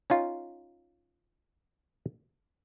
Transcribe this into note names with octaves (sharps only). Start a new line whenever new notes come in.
C#4 D#4 F4